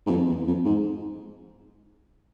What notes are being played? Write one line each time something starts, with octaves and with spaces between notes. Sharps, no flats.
G#2
F2
E2
F2
G#2